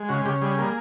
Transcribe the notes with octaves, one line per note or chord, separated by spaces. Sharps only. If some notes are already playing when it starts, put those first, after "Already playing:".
Already playing: G#3
C#3 F#4
C#3 G4
G3 G#4
A#3